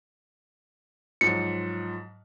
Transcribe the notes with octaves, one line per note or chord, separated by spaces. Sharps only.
G#2 F3 F#3 C#7